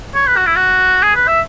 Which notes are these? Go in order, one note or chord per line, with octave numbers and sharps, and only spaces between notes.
C#5
B4
F#4
E4
F#4
G#4
B4
E5